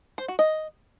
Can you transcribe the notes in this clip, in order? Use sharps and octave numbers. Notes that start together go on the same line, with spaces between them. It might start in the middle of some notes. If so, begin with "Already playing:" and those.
C5
F#4
D#5